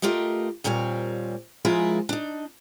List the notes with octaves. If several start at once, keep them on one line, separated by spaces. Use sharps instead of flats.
A3 F4 G4 A#4 D#5
D#2 A#2 G3 C4 C#5
F3 G#3 E4 F4 G#4 A#4
D4 D#4